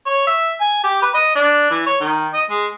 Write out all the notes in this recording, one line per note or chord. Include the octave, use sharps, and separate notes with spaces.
C#5
E5
G#5
G4
B4
D#5
D4
E3
C#5
D#3
D#5
G#3